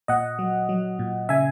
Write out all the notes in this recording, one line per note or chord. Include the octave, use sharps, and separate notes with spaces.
A#2 D#5 F#5
F#3
F#3
A#2
C#3 E5 G#5